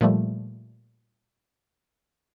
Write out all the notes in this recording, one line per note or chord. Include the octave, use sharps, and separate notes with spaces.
A#2 F3 G3 A3